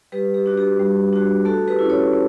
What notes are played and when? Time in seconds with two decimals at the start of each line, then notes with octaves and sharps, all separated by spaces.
0.12 G3 G4 B4
0.34 G4
0.46 D4 F#4
0.57 G4
0.79 G3
1.13 D4 F#4
1.45 A3 F#4 A4
1.68 G4 B4
1.79 C#4 E4
1.90 A4 C#5
2.12 A3